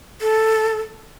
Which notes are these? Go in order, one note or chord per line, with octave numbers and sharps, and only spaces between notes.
A4